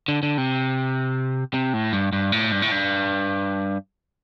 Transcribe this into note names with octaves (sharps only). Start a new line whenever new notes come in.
D3
D3
C3
C3
A2
G2
G2
A2
G2
A2
G2